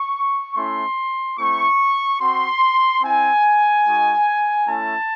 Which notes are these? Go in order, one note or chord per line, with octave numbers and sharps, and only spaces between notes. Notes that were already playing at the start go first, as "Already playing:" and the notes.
Already playing: C#6
A3 C#4 E4 C6
A3 C4 E4 C#6
C4 F#4 C6
C4 E4 G#5
G#3 D#4 F#4
A3 C#4 E4 A5